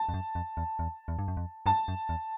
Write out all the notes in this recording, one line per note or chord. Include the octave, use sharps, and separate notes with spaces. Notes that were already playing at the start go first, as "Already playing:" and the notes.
Already playing: A5
F2
F#2
F2
E2
E2
E2
G2
F#2
F2
G2 A5
F#2
E2